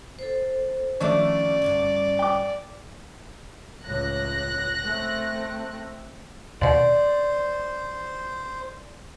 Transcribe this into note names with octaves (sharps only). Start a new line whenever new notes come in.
A4 C5
D#3 F3 A3 A#3 C#4 D4 D5
D2 G2 F#5
G5 D6
C#2 A2 F#6 A#6
A3 C4
D#2 B2 C5 D5